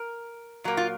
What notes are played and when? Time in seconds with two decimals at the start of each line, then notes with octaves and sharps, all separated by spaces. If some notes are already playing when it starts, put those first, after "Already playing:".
Already playing: A#4
0.64 A#2 F#3 A#3
0.77 F4